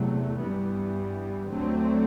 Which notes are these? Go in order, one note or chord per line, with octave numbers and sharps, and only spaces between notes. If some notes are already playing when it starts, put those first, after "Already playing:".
Already playing: E2 C3 F#3 A3
G2 E3 G3 B3
D2 D3 F#3 A3 C4